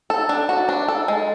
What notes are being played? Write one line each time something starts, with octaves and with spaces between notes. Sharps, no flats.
A4
D4
F#4
D4
A4
G#3